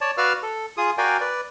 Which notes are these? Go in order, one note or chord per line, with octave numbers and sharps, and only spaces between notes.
C#5 D5 A5
F#4 B4 D5 F5 E6 F6
A4
F4 G#4 D#6
F#4 A#4 D5 F5 G5 G#5
B4 D5